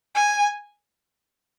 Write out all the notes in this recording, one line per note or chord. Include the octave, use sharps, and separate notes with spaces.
G#5